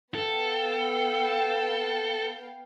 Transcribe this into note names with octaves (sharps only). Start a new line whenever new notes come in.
B3 A4 F5 G5